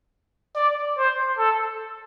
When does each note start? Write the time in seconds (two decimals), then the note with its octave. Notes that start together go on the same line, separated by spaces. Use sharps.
0.56 D5
0.98 C5
1.38 A4